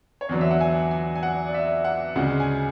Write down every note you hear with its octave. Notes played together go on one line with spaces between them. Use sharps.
C#5
E2 D3 F#3 D5
E5
F#5
G#5
G#5
G#5
F#5
D5
E5
F#5
D2 C#3 G#3 F#5
G#5